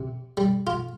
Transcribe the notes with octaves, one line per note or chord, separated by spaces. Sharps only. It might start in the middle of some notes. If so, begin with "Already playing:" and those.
Already playing: C3
G3
F4